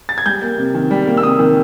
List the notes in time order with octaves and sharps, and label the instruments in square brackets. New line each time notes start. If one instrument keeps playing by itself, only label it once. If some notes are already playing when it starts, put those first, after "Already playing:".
[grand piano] A6
G#6
G3 G6
A#3
C3
D#3
G3
A#3
E6
C3 D#6
D#3